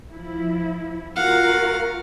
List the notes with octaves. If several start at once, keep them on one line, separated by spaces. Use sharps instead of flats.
F3 E4
F4 F#4 A#4 F5 F#5